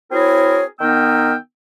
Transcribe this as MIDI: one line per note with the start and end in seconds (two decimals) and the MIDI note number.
0.12 0.63 60
0.12 0.63 64
0.12 0.63 66
0.12 0.63 68
0.12 0.63 70
0.12 0.63 73
0.80 1.34 51
0.80 1.34 59
0.80 1.34 63
0.80 1.34 79
0.80 1.34 88
0.80 1.34 89